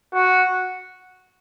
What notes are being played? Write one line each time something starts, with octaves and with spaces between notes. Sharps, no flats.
F#4